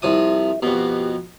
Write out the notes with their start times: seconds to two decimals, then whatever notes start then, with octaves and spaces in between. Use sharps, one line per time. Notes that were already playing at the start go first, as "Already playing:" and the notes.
0.02 C2 F3 E5 D#6
0.62 F2 B2 G4